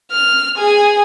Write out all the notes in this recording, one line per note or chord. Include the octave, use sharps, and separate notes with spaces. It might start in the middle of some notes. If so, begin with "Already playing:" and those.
F6
G#4 G#5